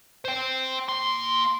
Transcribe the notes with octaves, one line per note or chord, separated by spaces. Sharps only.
C5 G5
A#3 C6